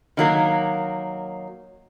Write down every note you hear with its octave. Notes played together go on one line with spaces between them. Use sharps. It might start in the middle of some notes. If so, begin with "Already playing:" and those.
D#3 F#3 A#3